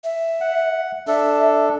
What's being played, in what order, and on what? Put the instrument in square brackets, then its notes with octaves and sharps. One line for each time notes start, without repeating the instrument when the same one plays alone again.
[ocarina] E5
[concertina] F#5
[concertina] D4 A4 [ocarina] E5